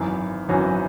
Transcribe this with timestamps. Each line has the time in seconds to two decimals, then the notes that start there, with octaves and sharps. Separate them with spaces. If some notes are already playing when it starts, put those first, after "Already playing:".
Already playing: G#1 F#2 E3
0.49 G#1 F#2 E3 C#4 F#4